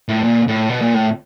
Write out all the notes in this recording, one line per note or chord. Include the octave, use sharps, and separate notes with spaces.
A2
A#2
A2
B2
A#2
A2